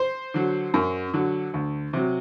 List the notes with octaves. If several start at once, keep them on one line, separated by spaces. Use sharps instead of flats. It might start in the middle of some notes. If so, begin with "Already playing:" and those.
Already playing: C5
D3 F#3
F#2
D3 F#3
D2
C3 F#3